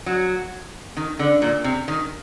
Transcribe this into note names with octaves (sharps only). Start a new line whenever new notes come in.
F#3
D#3
D3
A#2
C3
D#3